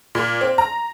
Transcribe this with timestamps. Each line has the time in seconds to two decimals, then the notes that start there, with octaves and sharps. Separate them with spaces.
0.15 A#2
0.41 C4
0.58 A#5